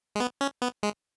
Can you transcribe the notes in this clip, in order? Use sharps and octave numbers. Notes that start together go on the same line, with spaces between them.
G#3
B3
C#4
B3
G#3